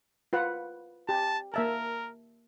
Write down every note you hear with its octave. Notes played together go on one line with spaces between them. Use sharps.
F4 B4 F#5
G4 A5
A#3 A#4 E5 A5